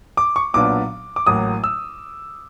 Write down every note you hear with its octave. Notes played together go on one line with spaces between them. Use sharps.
D6
C#6
B1 A#2 F#3 B3 D4 D6
D6
A1 A2 F#3 A#3 D#6
E6